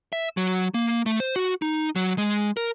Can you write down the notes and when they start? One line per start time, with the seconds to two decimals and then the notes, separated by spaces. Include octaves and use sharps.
0.13 E5
0.37 F#3
0.74 A#3
1.06 A3
1.20 C5
1.36 F#4
1.62 D#4
1.96 F#3
2.18 G#3
2.57 A#4